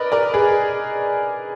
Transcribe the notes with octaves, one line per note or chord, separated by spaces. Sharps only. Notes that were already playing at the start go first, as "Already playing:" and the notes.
Already playing: A#4 B4 D5 D#5
A#4 D5
G#4 B4